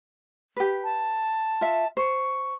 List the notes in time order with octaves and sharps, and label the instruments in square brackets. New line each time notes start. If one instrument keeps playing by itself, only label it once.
[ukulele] G4 B4
[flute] A5
[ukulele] F4 E5
[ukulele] C5 [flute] C#6